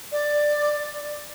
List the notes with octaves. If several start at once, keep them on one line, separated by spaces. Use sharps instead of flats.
D5